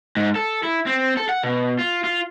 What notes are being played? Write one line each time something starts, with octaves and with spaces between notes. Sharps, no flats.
G#2
A4
E4
C4
A4
F#5
B2
F4
F4